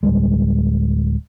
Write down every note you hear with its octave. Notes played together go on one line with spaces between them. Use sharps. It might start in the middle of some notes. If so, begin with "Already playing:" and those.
D1 G1 G3 G#3